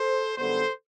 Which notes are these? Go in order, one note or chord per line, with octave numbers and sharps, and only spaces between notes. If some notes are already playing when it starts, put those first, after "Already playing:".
Already playing: A4 C5
F#2 D3 G3 B3 A4 C5